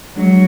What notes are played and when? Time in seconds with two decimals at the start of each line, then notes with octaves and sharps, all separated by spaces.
0.15 F3 F#3 G#3 D4 G#4 D#5